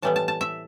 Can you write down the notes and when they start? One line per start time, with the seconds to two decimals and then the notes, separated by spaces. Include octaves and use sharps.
0.02 A2 E3 G3 B3 A5
0.16 A5
0.28 A5
0.41 E5